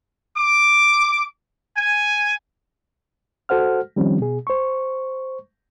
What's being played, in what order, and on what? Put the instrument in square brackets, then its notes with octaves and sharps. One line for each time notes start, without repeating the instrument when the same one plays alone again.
[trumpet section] D6
G#5
[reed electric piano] F#4 A4 C5 F#5 F6
D#3 F3 G3 C4 C#4
B2 G#4
C5 C#6